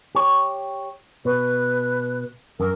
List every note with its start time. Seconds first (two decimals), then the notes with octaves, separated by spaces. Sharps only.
0.15 G4 C#5
1.25 B2 B4
2.60 F#2 A#4